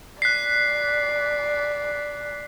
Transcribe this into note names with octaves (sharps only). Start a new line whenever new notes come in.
D5 F#6 B6 C7